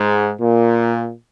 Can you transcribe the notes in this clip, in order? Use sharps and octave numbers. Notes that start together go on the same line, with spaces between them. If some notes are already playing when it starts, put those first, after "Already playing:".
Already playing: G#2
A#2